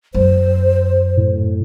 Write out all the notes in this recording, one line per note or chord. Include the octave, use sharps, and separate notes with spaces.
F#2 C5
A2